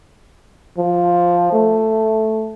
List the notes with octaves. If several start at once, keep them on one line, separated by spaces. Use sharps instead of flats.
F3
A3